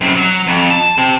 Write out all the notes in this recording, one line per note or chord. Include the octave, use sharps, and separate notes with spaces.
F#2 C3
F#3
F2
A5
C4 G4